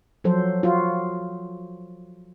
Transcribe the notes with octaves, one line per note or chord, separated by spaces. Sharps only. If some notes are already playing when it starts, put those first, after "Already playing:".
F3 F#3 A4 C5
F4 F#4